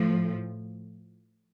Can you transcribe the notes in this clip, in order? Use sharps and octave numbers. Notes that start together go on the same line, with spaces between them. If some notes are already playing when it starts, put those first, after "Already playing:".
Already playing: A2 F3